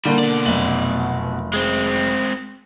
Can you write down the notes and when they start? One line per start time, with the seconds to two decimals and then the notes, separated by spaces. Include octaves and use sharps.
0.05 D3 G3 A#3 C6
0.19 B2 D5
0.46 F1 F#2 F#7
1.53 G#3 C4